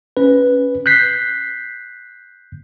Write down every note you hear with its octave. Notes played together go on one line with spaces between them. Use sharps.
C#4 B4
F#6 G6 B6 C7